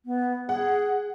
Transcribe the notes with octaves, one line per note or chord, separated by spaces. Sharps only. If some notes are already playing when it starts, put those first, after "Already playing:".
B3
G#4 F#5